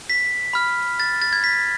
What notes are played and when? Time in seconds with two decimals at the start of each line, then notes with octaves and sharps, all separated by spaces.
0.10 B6
0.53 B5 F6
1.00 A6
1.22 A6
1.33 G#6
1.44 B6